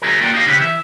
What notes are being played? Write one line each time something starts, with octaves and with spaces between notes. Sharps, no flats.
D#3 F#3 A3 B3 G#4 A#4
A#3 F4 F#4 D5 G5
D#4 G4 D#5 F5
C#3 C4 C#4 G4 B4
E3 E5